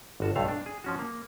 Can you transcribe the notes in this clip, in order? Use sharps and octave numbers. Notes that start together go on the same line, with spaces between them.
G1 F#4 A5
B1 G2 A3 C#5 F5
D4
G#4
F3 C#4 F#4
A#3